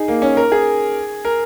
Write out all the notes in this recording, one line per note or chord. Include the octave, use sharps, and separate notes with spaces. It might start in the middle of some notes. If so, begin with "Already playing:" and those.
Already playing: D#4 G#4
A#3
C#4
A#4
G#4
A#4